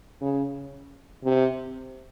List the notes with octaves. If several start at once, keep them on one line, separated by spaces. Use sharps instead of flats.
C#3
C3